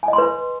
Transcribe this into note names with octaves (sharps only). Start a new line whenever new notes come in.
G#5
D#5
C6
B4